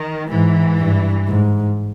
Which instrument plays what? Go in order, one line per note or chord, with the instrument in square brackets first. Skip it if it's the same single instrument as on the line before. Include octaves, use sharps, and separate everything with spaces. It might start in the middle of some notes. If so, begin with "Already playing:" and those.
Already playing: [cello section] D#3
[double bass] G#2 [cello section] E3
[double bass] G2
G#2